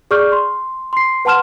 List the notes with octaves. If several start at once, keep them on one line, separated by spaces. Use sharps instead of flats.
G#4 D5 C#6 F6 G6
C6
C6 C7
B4 F#5 A5 C6 F6 E7